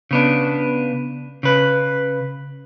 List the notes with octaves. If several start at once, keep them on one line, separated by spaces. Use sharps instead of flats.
C#3 B3 D4
C#3 B4